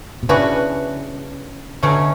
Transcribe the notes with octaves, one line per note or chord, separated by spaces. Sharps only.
B2
C#3 E3 B3 D4 F#4
B2 D3 F#3 A3 C#4